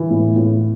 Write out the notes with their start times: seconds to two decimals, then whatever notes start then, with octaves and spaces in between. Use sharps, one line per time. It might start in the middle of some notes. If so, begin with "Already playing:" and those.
Already playing: E3
0.10 A2
0.36 A2